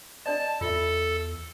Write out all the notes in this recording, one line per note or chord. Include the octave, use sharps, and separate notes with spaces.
D4 D5 D#5 A5
E2 F4 A4 E5